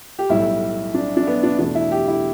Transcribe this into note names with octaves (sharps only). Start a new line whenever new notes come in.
G4
B1 A2 G3 E4
D4
D4
B3
D4
E2 B2 A3 D4
E4
G4
E4